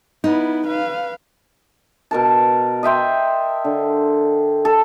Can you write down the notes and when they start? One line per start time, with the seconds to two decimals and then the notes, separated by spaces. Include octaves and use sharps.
0.24 B3 D#4 E4
0.67 B4 F5
2.11 B2 A#4 A5
2.83 D#5 E5 G5 C6
3.65 D3
4.65 A4